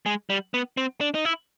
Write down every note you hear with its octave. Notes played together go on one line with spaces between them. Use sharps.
G#3
G3
B3
C4
D4
D#4
E4